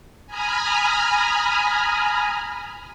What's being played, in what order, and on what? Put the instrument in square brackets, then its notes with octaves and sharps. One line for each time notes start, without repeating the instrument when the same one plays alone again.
[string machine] G#5 A#5 B5 D#6 F6